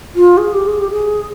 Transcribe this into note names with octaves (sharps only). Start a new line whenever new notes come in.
F4
G#4
G4
G#4
G4
G#4